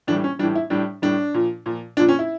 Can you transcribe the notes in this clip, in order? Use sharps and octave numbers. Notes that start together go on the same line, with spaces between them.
A2 E3 G3 D4
C#4
A2 E3 G3 D4
E4
A2 G3 D4
A2 G3 D4
A#2 F3
A#2 F3
A#2 F3 D4
C#4
E4